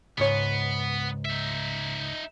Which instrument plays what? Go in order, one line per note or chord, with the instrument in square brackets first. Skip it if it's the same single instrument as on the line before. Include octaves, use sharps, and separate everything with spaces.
[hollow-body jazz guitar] C#2 G#2 C#5 [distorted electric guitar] B3
[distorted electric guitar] D#4 E5